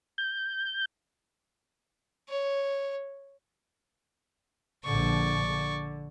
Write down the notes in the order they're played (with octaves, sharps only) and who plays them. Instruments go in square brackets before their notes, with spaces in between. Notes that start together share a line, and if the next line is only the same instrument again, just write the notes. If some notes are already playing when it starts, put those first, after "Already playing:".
[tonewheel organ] G6
[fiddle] C#5
[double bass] A#1 D3 [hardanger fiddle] D5 C#6
[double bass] D3